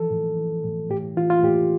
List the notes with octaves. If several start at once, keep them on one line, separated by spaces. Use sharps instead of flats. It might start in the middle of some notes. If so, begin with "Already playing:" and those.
Already playing: E3 F3 A4
A2
E3
A2
A2 G4
E3 F4
F4
A2 G4